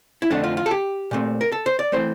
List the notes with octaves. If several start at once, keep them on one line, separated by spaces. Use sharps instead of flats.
E4
F2 D3 A3 C4 D4
F4
F4
A4
G4
A#2 A3 C4
A#4
A4
C5
D5
E3 A3 C4 C5